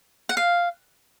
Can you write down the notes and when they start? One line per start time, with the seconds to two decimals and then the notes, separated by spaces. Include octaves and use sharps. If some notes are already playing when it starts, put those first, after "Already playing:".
0.29 F#5
0.37 F5